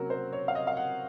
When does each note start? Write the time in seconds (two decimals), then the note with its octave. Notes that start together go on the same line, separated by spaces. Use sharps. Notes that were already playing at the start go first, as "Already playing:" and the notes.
Already playing: C3 F#3 A#3 C#4 F#4 A#4
0.10 C5
0.33 C#5
0.48 F5
0.55 D#5
0.67 F5
0.77 F#5